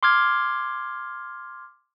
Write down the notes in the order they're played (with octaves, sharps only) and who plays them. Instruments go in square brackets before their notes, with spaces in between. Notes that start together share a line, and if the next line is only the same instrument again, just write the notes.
[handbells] C6 D6 F6 G#6